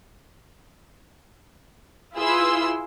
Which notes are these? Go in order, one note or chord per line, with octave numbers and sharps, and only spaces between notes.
E4 F4 G#4 B4 C6 E6